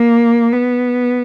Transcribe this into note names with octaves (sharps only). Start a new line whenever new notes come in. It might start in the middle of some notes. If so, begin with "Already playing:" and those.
Already playing: A#3
B3